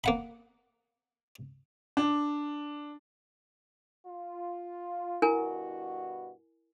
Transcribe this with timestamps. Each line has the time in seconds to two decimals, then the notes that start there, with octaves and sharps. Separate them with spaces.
0.04 A#3 F#5 B5
1.97 D4
4.07 F4
5.22 G2 B2 E4 F#4 A#4 G#5